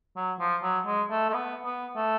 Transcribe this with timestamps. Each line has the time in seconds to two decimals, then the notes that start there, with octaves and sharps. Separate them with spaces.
0.16 F#3
0.39 F3
0.63 F#3
0.86 G#3
1.10 A3
1.29 A3
1.34 B3
1.65 B3
1.96 A3